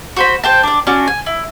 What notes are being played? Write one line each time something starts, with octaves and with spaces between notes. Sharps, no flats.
F#4 C5 B5
C5 G5 A5
D4 D5
C#4 D4 F#4
G#5
E4